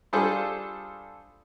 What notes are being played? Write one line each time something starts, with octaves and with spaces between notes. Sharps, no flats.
G3 D4 F4 G#4 A4 C5